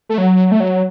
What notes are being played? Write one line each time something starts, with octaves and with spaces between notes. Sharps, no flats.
A3
F#3
A3
F#3